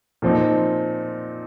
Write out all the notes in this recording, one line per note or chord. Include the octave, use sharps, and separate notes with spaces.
A#2 F3 C4 D#4